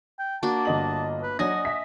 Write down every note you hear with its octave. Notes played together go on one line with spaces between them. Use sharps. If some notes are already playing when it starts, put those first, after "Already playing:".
G5
A#3 D4 F#4 A5
G1 D#5 F#7
B4
F#3 D4 D#5 F#5 G#5 A#6
E5 B6